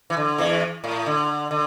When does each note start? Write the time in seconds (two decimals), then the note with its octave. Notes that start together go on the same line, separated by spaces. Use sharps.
0.10 E3
0.17 D3
0.38 E2 E3
0.84 A2
1.06 D3
1.51 D3